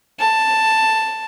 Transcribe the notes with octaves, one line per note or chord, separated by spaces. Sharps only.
A5